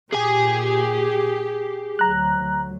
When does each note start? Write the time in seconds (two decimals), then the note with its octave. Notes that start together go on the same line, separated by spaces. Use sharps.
0.12 A#2 G4 G#4 G#5
1.99 D2 F#3 A#5 F#6